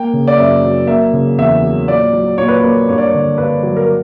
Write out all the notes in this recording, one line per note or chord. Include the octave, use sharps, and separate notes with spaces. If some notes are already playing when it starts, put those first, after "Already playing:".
Already playing: A#3 G5
C#3
D5
F#2 E5
F#3
A#3 E5
C#3
E2 E5
F#3
A#2 D5
F#3
A#2 C#5
B4
A#3 C#5
G2 C#5
D5
C#5
D3
G2 B4
F#3
A#4